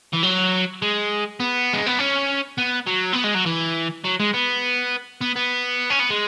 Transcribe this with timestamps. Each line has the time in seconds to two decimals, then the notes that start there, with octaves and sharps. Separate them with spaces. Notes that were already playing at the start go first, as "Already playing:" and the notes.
0.13 E3
0.23 F#3
0.82 G#3
1.40 B3
1.73 G#3
1.87 B3
1.99 C#4
2.58 B3
2.87 F#3
3.13 B3
3.24 G#3
3.35 F#3
3.46 E3
4.04 F#3
4.20 G#3
4.34 B3
5.21 B3
5.36 B3
5.90 C#4
6.00 B3
6.10 G#3